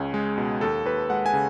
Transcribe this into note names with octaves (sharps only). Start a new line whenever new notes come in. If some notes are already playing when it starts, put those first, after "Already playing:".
Already playing: C#2 G#3 C#4
G#3
B2
D#2 A4
D#2 B4
G#3 F#5
G#5
C#3